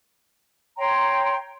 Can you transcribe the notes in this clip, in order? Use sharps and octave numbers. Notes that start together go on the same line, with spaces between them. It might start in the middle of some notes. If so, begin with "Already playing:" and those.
C#5 G5 A#5 C6